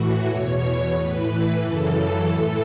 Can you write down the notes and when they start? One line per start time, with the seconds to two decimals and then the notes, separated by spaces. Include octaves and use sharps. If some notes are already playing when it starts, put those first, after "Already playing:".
Already playing: A2 E3 F#4
0.27 E2 B2 C#5
0.95 A2 E3 B4
1.61 F#2 C#3 E3 A4
2.29 A2 E3